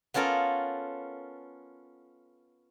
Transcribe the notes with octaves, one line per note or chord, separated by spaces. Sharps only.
B3 C#4 F4 A4 A#4